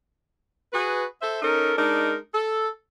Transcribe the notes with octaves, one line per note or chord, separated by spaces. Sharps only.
F#4 G#4 B4
A4 C5 E5
C#4 D#4 A4 A#4
G#3 D4 D#4 A#4
A4